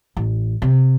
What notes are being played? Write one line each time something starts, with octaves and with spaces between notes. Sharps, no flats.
A1
C3